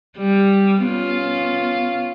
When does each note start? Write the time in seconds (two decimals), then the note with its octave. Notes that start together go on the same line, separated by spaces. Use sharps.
0.17 G3
0.83 B3 C#4 F4